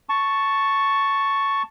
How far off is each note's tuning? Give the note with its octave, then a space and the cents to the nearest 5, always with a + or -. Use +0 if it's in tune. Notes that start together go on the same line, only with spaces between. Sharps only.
A5 +0 C#6 +0